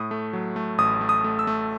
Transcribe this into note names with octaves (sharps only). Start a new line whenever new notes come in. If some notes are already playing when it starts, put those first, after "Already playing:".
Already playing: A2 D#6
A3
F#3
A3
A1 D#6
A3
D#6
A3
E6
A3